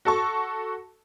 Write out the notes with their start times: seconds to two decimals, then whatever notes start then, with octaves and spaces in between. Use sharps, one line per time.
0.05 F#4 A4 A5 C#6